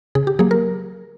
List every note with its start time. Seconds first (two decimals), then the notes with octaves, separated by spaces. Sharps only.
0.15 C#3 G#4
0.27 G4
0.39 F#3 A#3 G#4
0.51 A#4